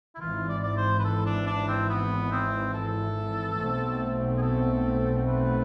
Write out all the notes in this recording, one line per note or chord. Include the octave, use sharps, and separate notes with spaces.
E4
G#1 G#2 E3 F4
D5
D5
C5
B4
A4
D4
D4
C4
B3
C4
A4
B1 B2 A3 C4
G#4
A4
B4